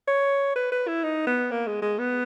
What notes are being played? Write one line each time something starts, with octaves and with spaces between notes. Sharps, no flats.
C#5
B4
B4
E4
D#4
B3
A#3
G#3
G#3
B3